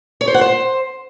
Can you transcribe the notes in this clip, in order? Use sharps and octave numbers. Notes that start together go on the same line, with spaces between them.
C#5
C5
F#5
C5